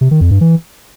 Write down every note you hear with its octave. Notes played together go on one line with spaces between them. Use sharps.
C3
D#3
F2
G2
E3